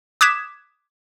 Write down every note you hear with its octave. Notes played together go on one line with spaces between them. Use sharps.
D6 D#6 F#6 G#6 B6 E7